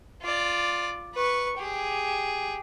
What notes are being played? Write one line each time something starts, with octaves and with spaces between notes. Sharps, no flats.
F4 D5
B4 C#6
G4 G#4